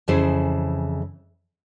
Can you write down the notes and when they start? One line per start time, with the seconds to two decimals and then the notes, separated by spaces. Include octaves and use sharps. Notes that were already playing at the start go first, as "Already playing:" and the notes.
0.08 F2 C#3 E3 E4 G#4 C5